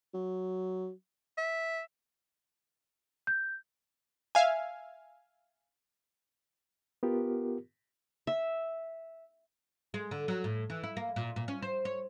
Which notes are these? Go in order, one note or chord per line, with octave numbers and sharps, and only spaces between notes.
F#3
E5
G6
E5 F5 G#5
B3 F4 G4 A#4
E5
G#3
D3
F#3
A2
E3
E4
A#3
A#2
A#2
C#4
C5
C#5